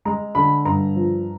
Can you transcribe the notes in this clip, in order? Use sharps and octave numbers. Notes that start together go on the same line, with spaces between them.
G#3 A#5
D3 B5
G2 A#5
F3